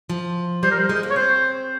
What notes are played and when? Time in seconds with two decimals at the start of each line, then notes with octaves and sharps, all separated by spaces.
0.10 F3
0.63 G3 C5
0.71 A#4
0.79 C5
0.89 G#3
1.03 A#3
1.10 C#5
1.16 C4 C5